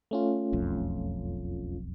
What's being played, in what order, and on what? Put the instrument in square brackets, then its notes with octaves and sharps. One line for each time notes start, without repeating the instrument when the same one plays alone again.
[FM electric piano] A3 C#4 F4
[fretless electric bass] E1 B1 F2